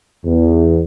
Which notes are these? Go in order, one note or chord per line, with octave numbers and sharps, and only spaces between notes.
E2